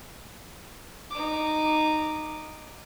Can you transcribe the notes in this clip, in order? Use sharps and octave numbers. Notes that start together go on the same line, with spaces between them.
D#4 D6